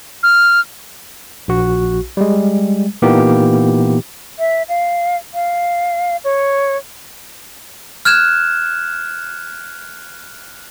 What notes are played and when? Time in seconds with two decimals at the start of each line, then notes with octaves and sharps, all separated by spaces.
0.23 F6
1.48 A#1 F#4
2.17 G3 G#3
3.02 A#2 E3 A#3 B3 D#4 G4
4.39 E5
4.69 F5
5.34 F5
6.24 C#5
8.05 F6 F#6 G#6 E7